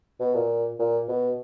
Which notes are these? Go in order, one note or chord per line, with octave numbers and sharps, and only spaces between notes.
B2
A#2
A#2
B2